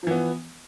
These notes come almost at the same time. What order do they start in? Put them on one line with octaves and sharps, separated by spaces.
F3 E3 B3